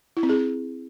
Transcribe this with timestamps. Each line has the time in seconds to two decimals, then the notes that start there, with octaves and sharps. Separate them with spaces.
0.17 E4
0.23 C4
0.29 G#4